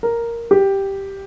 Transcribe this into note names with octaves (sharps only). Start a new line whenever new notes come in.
A#4
G4